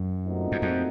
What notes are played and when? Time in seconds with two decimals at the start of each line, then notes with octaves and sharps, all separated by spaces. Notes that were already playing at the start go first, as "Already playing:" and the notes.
Already playing: F#2
0.24 A#2 A3 C4 D#4 F#4
0.52 F#2
0.62 F2